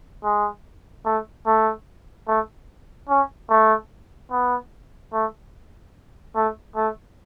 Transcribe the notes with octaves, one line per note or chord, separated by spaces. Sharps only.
G#3
A3
A3
A3
C#4
A3
B3
A3
A3
A3